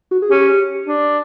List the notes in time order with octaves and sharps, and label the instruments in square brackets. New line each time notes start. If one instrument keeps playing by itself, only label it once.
[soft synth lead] F#4
G#4
[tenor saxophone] C#4 [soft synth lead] G4
[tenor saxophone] D4